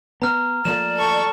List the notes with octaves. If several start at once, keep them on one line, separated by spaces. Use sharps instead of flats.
B3 A#5 F6
F3 A3 A#3 D5 E7
A4 C#6